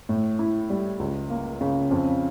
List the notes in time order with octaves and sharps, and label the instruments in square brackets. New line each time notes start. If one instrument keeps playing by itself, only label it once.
[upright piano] A2
E4
G3
C#2
A#3
C#3
F2